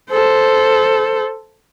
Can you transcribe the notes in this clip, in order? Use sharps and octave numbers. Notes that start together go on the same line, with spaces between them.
A4 C5